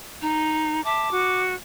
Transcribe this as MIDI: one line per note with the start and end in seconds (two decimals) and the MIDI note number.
0.22 0.83 63
0.85 1.08 76
0.85 1.08 81
0.85 1.40 86
1.10 1.54 66